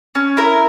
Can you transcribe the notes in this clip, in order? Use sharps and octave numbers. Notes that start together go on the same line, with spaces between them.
C#4
E4 A#4